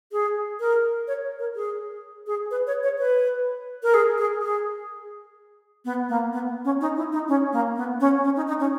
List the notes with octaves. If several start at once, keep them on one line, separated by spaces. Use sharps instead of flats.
G#4
A#4
C#5
A#4
G#4
G#4
B4
C#5
C#5
B4
A#4
G#4
G#4
G#4
B3
A#3
B3
C#4
D#4
E4
D#4
C#4
A#3
B3
C#4
C#4
D#4
D#4
C#4